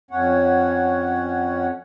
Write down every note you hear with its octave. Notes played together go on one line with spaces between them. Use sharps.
F2 C#4 C#5 F#5